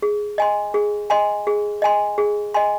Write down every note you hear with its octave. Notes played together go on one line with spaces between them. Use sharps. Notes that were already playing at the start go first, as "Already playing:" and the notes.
G#4
D#5 G#5 C6
G#4
D#5 G#5 C6
G#4
D#5 G#5 C6
G#4
D#5 G#5 C6